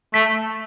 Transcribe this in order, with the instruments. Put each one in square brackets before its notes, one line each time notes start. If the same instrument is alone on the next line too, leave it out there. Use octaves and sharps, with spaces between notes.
[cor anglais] A3 [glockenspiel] B6